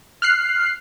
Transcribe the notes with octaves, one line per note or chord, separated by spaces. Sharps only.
F6 F#6 C7